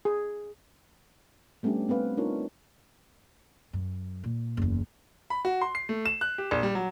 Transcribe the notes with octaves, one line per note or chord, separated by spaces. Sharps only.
G#4
G3 A3 B3 C#4 D4 G4
A3 B3 C4 B4 F5
D4 D#4 F4 A#4 C#5
F#2
A#2
F#1 E2
B5
F#4
C6
C7
A3
E7
F#6
G4
A#1
G3
F#3